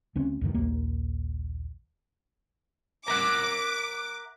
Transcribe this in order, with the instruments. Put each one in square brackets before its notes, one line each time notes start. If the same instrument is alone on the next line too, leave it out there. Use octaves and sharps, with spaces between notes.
[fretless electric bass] D2 C4 C#4
D2 G2 D#3
A#1 D#2 A#3
[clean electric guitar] A#4 E5 F#5 [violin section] D6